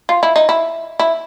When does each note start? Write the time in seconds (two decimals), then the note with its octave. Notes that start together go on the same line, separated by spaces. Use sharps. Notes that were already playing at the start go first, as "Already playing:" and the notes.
0.09 F4
0.23 E4
0.36 D#4
0.49 E4
0.99 E4